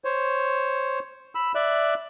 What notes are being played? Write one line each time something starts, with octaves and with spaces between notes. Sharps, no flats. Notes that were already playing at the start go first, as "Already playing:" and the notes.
C5 C#5
B5 E6
D5 E5 F#6